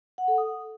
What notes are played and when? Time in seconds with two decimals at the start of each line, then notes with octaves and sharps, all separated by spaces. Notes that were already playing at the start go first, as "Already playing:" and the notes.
0.18 F#5
0.28 A4
0.38 D#6